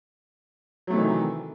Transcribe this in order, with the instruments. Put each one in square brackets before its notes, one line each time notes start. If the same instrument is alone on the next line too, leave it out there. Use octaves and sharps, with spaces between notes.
[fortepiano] F#3
A3
C3
E3
D#3